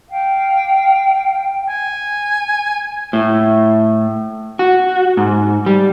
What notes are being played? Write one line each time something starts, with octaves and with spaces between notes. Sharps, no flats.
F5 G5
G#5
A2
F#4
G#2
G3